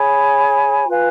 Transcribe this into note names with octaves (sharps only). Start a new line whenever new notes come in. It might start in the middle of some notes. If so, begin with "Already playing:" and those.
Already playing: G#4 C#5 G#5 B5
F4 B4 F5 G#5